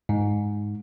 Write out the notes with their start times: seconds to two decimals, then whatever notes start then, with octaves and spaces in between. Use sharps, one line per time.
0.09 G#2